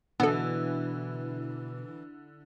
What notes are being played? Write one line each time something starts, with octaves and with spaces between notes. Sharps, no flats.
B2 D3 E3 B3 A4